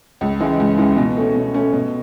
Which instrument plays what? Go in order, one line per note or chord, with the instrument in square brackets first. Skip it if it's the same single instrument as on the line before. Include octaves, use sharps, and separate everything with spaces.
[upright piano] C#2
C#3 E3 G#3
C#2
C#3 E3 G#3
B2
A3 C#4
B2
A3 C#4
B2